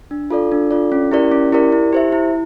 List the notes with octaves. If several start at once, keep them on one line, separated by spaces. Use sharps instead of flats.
D4
F4 A4 D5
D4
F4 A4 D5
C#4
E4 G4 A#4 D5
C#4
E4 G4 A#4 D5
E4
G4 C5 E5
E4